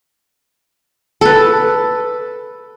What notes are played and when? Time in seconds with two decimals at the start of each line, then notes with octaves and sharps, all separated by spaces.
1.21 A4 B4